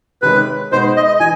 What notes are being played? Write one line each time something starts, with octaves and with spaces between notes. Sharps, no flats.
C3 D#3 G#3 C#4 B4
B2 G#3 B3 D#4 C5
D#5
D#5
E3 G#5